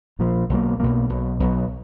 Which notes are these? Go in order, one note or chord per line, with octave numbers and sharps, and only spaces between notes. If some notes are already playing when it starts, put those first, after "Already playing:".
A#1 A#2 F3
B1 B2 F#3 A#3
B1 B2 F#3 A#3
B1 B2 F#3
B1 B2 F#3